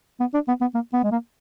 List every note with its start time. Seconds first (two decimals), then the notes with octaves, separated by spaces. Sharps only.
0.20 B3
0.34 D4
0.48 B3
0.61 B3
0.74 A#3
0.93 B3
1.04 G#3
1.11 A#3